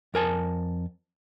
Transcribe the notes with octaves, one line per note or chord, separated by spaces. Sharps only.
F2 A#4 G#5 A5